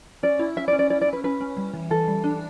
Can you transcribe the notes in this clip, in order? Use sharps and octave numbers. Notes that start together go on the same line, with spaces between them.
C#4 D5
E4
C#4 E5
D5
C#4
D5
E4 D5
D5
C#4
B4
C#4 B4
C#4
G3
E3
E3 A4
G3
D4